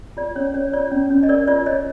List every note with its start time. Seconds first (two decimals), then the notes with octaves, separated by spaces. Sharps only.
0.17 F4 D5
0.36 C#4 C#5
0.54 C#5 D5
0.73 F4 D5
0.92 C#4
1.10 C#4
1.23 D#5
1.29 A#4 D5
1.48 F4 D5
1.66 C#5 D#5